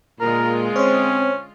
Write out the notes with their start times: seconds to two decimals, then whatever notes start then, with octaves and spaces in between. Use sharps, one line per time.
0.20 A#2 D3 G#3 F4 A#4
0.76 C4 C#4 C5 C#5